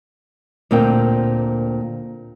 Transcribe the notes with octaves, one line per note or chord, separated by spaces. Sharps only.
D2 A#2 C4 A#4 G5